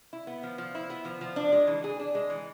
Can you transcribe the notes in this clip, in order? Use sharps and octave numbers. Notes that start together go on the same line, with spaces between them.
E4
B3
F3
F3
E4
B3
F3
F3
D4
G#3
E3
G#4
D4
G#3
E3